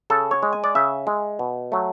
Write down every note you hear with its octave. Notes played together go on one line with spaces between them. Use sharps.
C#3 A4
C#5
G#3
G#5
D5
C#3 E5
G#3
B2
F#3 A3